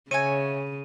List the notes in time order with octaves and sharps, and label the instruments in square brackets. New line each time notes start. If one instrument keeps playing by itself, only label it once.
[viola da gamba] C#3 [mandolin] F#4 E5 G#5 [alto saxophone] C#5 [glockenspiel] D#7